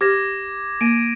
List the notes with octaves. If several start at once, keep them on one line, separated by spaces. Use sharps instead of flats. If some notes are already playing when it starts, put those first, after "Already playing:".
G4 D6 G#6 A#6
A#3 D7 D#7